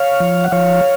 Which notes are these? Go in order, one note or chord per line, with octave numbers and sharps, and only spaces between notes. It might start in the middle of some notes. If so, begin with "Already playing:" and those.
Already playing: C#5 F5
F3
F#5
F3 C#5 F5